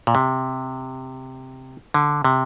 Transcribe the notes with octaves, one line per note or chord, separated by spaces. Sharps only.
A#2
C3
D3
C3